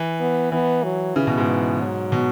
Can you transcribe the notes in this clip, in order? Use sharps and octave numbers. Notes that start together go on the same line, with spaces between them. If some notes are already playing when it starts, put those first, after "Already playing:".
Already playing: E3
B3
E3 B3
F#3
C#3 E3
B2
G#2
F#3
B2